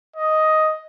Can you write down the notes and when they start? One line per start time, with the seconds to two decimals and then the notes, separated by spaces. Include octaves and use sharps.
0.16 D#5